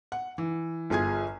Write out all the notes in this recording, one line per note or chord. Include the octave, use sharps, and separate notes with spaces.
F#5
E3
G1 F4 G#4 G#5 G#6